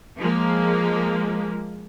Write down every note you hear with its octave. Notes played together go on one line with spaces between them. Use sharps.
F3 G#3 A#3